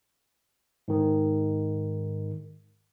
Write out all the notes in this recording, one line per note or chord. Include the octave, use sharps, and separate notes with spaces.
G#2 D#3